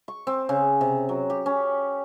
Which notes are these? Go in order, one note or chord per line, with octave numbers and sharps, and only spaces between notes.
C#6
C4
C#3
C3
F#3
G4
C#4